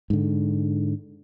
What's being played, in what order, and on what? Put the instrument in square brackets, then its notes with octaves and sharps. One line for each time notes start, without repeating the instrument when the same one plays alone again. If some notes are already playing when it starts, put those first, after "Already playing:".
[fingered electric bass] G#2 D3